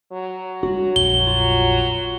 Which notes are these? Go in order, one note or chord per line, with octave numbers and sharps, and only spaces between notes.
F#3
G3 B3 D4 F#4
A#1 F2 G7
F4